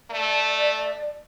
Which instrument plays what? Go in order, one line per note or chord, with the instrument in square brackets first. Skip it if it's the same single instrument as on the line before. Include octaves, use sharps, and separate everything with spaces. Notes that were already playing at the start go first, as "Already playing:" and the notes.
[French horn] A3 [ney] D5